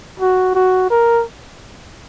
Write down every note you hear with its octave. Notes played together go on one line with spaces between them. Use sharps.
F#4
F#4
A#4